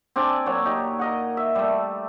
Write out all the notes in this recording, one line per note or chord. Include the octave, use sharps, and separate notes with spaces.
C4 D4 D5 G#5
A#2 F#3 C#5
D#4 G4
A#4 D#5 F#5
E5
G3 A3